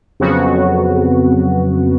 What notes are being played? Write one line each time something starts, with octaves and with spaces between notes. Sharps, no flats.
F2 C#3 F#3 B3 F#4